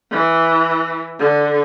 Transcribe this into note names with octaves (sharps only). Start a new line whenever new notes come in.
E3
D3